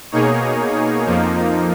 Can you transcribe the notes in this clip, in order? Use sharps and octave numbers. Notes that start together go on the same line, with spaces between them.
B2 A#3 D#4 G#4 C#5
F2 F3 A#3 D#4